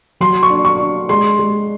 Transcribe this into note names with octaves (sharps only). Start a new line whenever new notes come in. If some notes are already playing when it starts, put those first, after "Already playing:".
F#3 C6
C#6
D4
C#6
D4
G#3 C6
G#3